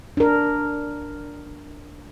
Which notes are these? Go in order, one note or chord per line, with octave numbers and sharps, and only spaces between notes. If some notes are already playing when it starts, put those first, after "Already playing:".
D4 A#4